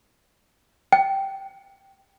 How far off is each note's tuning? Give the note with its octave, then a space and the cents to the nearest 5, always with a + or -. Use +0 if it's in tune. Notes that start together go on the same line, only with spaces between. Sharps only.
G5 -10